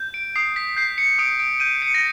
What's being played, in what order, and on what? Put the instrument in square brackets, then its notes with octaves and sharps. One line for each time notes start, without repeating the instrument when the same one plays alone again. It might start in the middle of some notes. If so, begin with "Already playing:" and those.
Already playing: [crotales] G6
D7
D#6 C7
B6
G6 C7
C#7
D#6 D7
D7
G6 D#7
C#7
A#6